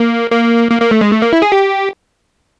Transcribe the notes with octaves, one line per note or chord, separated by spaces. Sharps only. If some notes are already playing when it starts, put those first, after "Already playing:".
Already playing: A#3
A#3
A#3
A#3
A3
G#3
A3
A#3
E4
G#4
G4